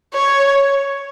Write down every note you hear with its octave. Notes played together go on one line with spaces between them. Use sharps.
C#5